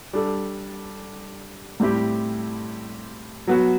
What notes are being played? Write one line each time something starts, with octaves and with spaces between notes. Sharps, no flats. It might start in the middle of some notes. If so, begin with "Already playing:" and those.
G3 D4 A4
A2 G3 C4 E4 G4
F#3 B3 F#4